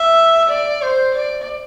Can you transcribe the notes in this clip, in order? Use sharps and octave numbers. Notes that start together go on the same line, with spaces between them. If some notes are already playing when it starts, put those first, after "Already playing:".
Already playing: E5
D5
C5
D5